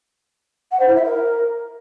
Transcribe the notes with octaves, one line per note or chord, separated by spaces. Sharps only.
F#5
C5
E4
E5
A#4